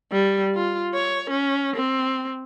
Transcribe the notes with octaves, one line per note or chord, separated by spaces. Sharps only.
G3
F4
C#5
C#4
C4